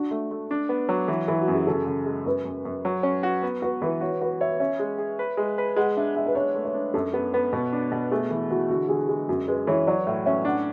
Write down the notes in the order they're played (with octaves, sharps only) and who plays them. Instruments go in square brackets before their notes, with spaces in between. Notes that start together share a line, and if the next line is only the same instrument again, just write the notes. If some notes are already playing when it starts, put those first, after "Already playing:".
Already playing: [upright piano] D4 [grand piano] F#4
[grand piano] A3
A3
D4
B3
F#3
E3
E3
[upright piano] F#4
[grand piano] F#2
[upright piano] G#4
[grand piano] C#3 [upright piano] A4
[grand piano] C#3
G#3
[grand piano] F#2 [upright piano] B4
[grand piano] F#2
F#2
F#3
C#4
F#4
B3
[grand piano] F#4 [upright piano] B4
[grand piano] E3 [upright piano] B4
[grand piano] F#4 [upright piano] C#5
[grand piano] F#4 [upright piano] B4
[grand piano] C#5 [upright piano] E5
[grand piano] C#4 [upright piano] E5
[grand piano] G#3
G#4
B4
G#3
B4
[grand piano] G#3 [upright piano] F#5
[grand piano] D4 [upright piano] E5
[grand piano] G#3 [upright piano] E5
[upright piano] B4
[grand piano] D4 [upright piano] C#5
[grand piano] A3
[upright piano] C#5
[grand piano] D4
[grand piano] F#2 [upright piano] A4
[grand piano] B3 [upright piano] A4
[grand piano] B3 [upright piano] B4
[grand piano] B2 [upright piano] B4
[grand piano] D4
B2
[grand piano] A3 [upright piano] G#4
[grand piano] E3
[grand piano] E3 [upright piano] F#4
[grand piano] D3 [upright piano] F#4
[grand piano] D3 [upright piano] G#4
[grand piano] G#3 [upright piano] G#4
[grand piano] F#2 [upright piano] F#4
[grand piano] G#3 [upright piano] B4
[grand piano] E3 [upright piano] C#5
[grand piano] F#3 [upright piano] D5
[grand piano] A2 [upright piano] E5
[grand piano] C#4 [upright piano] E5
[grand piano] D4 [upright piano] F#5